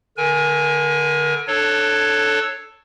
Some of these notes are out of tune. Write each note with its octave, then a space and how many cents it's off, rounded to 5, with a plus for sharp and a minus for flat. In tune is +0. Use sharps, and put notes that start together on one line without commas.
D3 +0 A#4 +35 G#5 +0
D4 +20 A4 +0 C#5 +0